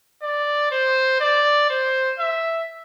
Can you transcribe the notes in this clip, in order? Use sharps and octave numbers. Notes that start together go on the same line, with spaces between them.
D5
C5
D5
C5
E5